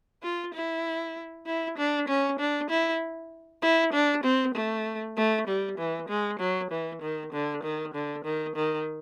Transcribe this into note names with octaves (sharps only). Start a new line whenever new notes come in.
F4
E4
E4
D4
C#4
D4
E4
E4
D4
C4
A3
A3
G3
E3
G#3
F#3
E3
D#3
D3
D#3
D3
D#3
D#3